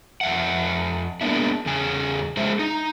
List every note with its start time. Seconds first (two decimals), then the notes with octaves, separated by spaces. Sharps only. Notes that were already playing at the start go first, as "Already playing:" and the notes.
0.21 F2 E5 F#5
1.21 G#3 A#3 B3 D4 E4
1.66 E2 C#3 G#4 G#5
2.37 G#3 G#4 C5 E5
2.59 D#4